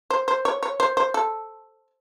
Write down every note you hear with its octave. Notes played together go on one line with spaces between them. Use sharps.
C5
C5
C#5
C#5
C5
C5
A4